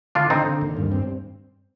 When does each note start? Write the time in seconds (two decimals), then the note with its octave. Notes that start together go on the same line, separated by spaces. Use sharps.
0.15 D3 D4 F4
0.30 D3 C4 D#4
0.46 D3
0.62 D#2
0.77 G2
0.92 C4